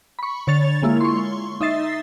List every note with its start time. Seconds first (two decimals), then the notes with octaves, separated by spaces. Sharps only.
0.19 B5 C#6
0.47 D3 C#5 C#6 A6 F7
0.82 G#3 A#3 E4 F4
1.01 C6 C#6
1.61 D#4 D#5 E5 A6 C7